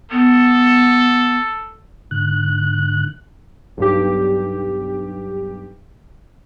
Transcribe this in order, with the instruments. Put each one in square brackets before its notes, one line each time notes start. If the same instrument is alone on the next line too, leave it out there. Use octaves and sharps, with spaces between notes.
[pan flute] B3 [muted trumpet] A4
[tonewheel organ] G#2 D3 F#6
[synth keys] B1 G2 G4